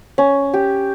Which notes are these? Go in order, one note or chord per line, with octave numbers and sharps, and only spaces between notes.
C#4
G4